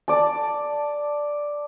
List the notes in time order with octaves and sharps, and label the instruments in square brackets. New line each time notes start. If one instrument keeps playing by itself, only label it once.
[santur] D5 A5